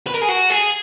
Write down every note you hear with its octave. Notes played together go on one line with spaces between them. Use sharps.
B4
A#4
G#4
F#4
G#4